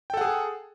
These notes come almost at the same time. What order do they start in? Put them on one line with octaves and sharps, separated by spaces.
G5 A4 F#5 G#4